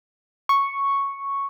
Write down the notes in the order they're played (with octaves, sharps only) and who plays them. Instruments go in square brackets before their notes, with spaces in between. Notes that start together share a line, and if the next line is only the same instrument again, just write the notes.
[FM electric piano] C#6